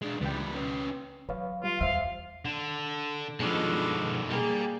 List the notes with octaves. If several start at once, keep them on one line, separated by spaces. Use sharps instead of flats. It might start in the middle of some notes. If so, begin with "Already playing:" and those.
G#3 D4
C#2 E3 G3 G5
C#4 B4
F#3 B4 C#5 F5
G3 F4
E2 G3 C5 E5 F5
D3
B2 D#3 F3 G#3 D4 A4
G3 A#3 G4 G#4